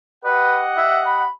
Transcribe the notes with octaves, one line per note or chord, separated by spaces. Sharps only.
G4 B4 D#5 F#5
E5
B5